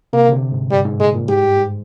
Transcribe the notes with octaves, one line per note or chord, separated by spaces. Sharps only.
C3 A#3
D3
C3
G#2
G2 G3
G#2
A#2 G#3
A#2
G#2 G4
G2
G#2